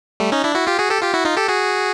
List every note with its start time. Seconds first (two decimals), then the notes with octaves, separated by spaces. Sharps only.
0.20 G3 A3
0.32 C#4 D#4
0.44 D4 E4
0.55 E4 F#4
0.67 F4 G4
0.79 F#4 G#4
0.90 G4 A4
1.02 F4 G4
1.14 E4 F#4
1.25 D#4 F4
1.37 G4 A4
1.48 F#4 G#4